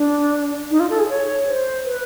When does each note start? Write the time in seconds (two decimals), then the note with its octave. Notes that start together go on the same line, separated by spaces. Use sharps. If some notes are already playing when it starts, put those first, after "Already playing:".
Already playing: D4
0.71 D#4
0.80 F4
0.90 A4
0.99 G#4
1.09 C#5
1.47 C5
1.85 B4